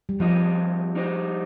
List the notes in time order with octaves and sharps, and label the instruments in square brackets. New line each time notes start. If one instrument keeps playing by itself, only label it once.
[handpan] G3
[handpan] F3 [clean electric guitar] G3 C4 F4 D#5
[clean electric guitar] G3 D#4 C5 D#5